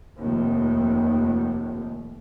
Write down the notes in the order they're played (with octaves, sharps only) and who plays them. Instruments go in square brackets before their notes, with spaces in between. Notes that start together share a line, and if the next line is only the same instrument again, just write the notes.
[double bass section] F1 D#2